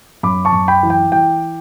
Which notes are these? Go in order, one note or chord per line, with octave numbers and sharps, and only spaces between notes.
F#2 B5 D6
A5 C#6
F#2
G5 B5
E3
G5
E3 G5